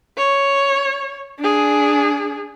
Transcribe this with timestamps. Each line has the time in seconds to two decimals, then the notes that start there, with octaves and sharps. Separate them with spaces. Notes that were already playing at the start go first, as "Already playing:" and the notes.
0.17 C#5
1.39 D4 G#4